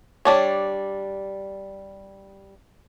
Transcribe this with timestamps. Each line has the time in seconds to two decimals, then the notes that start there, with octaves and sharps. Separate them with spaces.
0.25 G3 D4 C#5